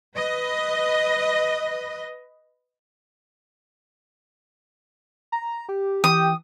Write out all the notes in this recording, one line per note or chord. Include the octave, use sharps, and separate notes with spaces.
B4 D#5
A#5
G4
E3 G4 G5 D#6